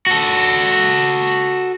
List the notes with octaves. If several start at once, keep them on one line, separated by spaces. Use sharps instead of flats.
F#4 A4